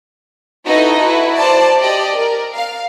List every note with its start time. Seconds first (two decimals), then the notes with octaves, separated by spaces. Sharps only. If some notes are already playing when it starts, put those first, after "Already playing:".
0.64 D#4 E4 F#4 A4 B4 D#5
1.00 E4 F#4 B4
1.35 C5 D5 A5
1.80 G4 D5 D#5
2.17 A#4
2.54 F5